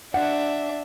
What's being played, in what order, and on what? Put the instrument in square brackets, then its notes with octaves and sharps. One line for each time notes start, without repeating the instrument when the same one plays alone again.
[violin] D4 E5 [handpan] F#5